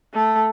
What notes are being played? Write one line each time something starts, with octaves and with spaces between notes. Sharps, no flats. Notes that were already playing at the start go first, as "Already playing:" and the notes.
A3